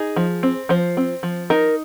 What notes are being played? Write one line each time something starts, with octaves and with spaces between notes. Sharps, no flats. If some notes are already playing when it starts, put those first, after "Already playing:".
Already playing: D#4 G#4
F3
C4
F3 C5
C4
F3
D#4 A#4